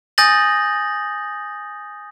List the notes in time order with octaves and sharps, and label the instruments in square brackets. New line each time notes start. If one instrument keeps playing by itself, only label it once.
[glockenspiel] G#5 D#6 G6 A6 A#6 F#7